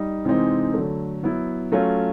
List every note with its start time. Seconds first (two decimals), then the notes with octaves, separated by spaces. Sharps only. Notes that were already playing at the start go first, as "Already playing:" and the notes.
Already playing: G3 D#4
0.25 C3 E3 G#3 C4 D#4
0.74 D3 F#3 A3
1.23 F#3 B3 E4
1.72 F#3 A3 C#4 F4